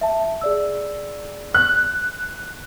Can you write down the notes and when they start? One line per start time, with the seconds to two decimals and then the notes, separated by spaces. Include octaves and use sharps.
0.01 E5 A5
0.41 G#4 D5 E6
1.55 F#6